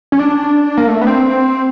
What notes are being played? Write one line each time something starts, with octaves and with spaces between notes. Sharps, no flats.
C#4
D4
A#3
A3
B3
C4